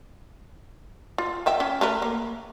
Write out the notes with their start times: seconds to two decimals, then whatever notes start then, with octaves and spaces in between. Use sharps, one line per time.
1.18 F4
1.46 F3 E5 G5
1.60 C#4
1.81 A3 A#4 B4
2.02 A#3